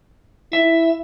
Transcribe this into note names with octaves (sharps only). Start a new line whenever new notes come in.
E4 E5